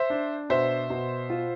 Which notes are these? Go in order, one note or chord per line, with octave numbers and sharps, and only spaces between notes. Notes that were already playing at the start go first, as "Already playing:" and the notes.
Already playing: C5 E5
D4
B2 C5 E5
B2
F4